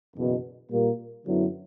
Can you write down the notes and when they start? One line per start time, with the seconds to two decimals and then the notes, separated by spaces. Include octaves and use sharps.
0.15 F#1 E2 B2
0.70 A#2 G3 A#3
1.26 F#2 D3 F#3 B3 E4